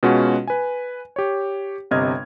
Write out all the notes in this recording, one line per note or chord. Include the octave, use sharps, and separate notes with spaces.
B2 G#3 C#4 F4 F#4
B4 G#5
G4 C#5
G1 C3 D#5 F6 G#6